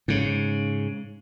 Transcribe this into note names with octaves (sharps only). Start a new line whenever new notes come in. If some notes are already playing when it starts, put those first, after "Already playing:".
G#2 C#3